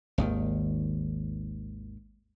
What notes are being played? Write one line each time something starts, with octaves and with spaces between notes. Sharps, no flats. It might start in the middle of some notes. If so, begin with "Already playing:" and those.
G#1 D#2 D#3